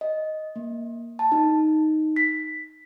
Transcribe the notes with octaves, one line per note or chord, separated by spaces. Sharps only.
D#5
A#3
A5
D#4
B6